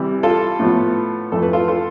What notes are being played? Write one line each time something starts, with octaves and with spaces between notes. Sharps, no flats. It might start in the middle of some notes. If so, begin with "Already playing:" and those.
Already playing: C3 E3 G3
F4 A4
A2 F3 B3
F2 E3 A3 A4
B4
F4 A4
F4 A4